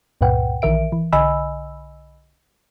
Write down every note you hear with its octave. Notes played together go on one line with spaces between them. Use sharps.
C#2 G2 A#2 B4 F#5 G5
A#1 D#3 E3 A#4 E5 D7
E3
B1 D3 D#5 G#5 B5 E6